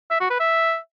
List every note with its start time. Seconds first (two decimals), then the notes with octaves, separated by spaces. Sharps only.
0.11 E5
0.20 F#4
0.30 B4
0.40 E5